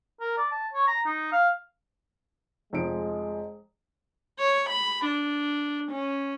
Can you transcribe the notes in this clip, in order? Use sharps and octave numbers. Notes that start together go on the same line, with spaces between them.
A#4
D5
A5
C#5
A#5
D#4
F5
F1 F3 G#3 D7
C#5
B5
D4
C#4